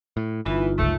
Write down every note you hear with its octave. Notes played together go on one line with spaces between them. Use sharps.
A2
G1 E3 D#4 F4
C#2 F#2 A3